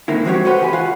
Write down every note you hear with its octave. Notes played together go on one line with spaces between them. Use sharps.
G#2 D3 D#3 A#3 E4
F3 G#3 C4 F#4 G4 C#5
F#4 A4 B4 C5 F5 F#5
C#2 E3 G4 G5 G#5 B5
F4 C#5 F5 F#5